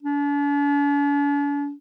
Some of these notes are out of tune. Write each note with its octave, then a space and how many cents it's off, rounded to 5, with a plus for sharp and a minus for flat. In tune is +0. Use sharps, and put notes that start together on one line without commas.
D4 -45